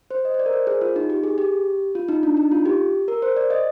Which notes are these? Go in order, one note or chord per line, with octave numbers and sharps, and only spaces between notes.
C5
D#5
C5
D5
A#4
C5
G#4
F4
D#4
G4
G#4
G4
F4
D#4
D4
D#4
F4
G4
A#4
C5
D5
D#5